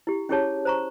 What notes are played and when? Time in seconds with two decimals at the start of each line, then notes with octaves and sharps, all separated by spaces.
0.07 E4 G4
0.29 C#4 E4 G4 G#4 C#5 A5
0.65 C5 A#5 C#6